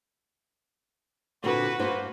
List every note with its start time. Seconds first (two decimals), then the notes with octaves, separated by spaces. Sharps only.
1.44 A#2 D3 C4 F#4 B4
1.79 G2 A#3 C5